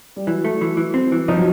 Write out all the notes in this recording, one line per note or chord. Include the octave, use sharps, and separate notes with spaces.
G3
E3 F#3
A3
E3
E3
C4
E3
F3 D#4
F#3